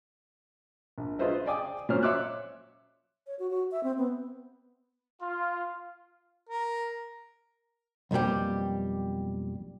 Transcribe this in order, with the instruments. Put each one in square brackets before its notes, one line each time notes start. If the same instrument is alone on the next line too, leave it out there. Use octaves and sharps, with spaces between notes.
[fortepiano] A#1
F4 G#4 B4 C5 D#5 E5
D5 G5 G#5 D6 D#6
A#2 F#3 C#4 C5 F6
C#5 E5 C6 D6 E6 F#6
[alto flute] C#5
F#4
F#4
E5
C4
B3
[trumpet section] F4
[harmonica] A#4
[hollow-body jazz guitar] B1 F2 A#2 G3 G4